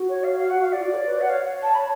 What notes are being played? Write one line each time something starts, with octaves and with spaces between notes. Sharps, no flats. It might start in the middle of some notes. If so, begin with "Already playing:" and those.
Already playing: F#4
C#5
F5
F5
F#5
F5
D5
F4
F#4
C#5
B4
C#5
F#5
C#5 F5
A5
B5